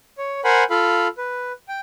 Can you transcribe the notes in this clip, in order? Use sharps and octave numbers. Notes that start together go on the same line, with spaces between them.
C#5
A#4 C5 F#5 G#5 B5
F4 A4 F5 B5
B4
G5